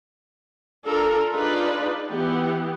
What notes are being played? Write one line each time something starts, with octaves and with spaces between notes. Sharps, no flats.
D4 F4 A4 A#4 A#5
D4 D#4 F4 G#4 B4 D5
E3 B3 G4